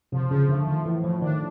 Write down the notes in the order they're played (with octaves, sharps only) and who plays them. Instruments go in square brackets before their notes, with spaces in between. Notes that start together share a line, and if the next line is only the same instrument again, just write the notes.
[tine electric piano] C3 [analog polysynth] F3
[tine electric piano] C#3 [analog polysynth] F3
[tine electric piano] D3 [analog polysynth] A3
[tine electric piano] D#3 [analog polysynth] F3
[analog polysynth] A2 [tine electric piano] E3
[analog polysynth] A2 [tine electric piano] F3
[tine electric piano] D#3 [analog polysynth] D4